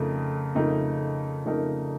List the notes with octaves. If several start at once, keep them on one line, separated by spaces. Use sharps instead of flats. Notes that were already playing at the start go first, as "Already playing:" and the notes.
Already playing: F2 C#3 A3 D#4 A#4
F2 C#3 A3 D#4 A#4
F2 C#3 A3 D#4 A#4